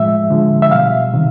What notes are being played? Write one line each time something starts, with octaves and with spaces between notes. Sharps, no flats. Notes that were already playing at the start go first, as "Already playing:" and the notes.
Already playing: A2 F3 G#3 E5
D3 F3 G#3
E5
B2 G3 F5
C3 D#3